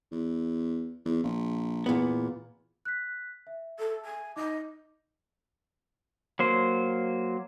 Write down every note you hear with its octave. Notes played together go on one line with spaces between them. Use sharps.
E2
E2
A#1
E2 A#2 B3
F#6 B6
E5
A4
G#5
D#4 D#5 D6
F#3 A#3 C5